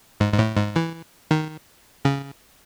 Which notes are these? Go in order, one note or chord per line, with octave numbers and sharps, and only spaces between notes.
G#2
G#2
A2
G#2
E3
D#3
C#3